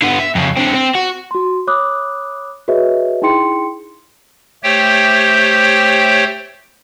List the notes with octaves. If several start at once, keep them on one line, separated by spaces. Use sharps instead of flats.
D3 B3
E5
F2 C#3
D3 C4
C4
F#4
F#4 C6
C#5 B5 D6 D#6 F#6
F#4 G#4 B4 C#5 D#5 E5
D#4 E4 G#4 G5 C6 C#7
A3 G4 C5 C#5 G5